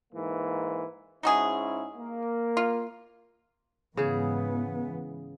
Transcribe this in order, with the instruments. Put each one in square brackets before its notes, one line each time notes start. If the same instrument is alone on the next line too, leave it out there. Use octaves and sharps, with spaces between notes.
[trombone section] G#2 E3 A#3
[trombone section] G#2 C#4 E4 [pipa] D#4 F#4 G#4
[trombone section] A#3
[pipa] F4
[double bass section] G#2 E3 B3 [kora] C#3 G#4